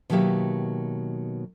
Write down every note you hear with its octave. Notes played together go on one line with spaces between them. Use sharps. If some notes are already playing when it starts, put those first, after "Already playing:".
B2 D#3 F#3 A#3 G4 E5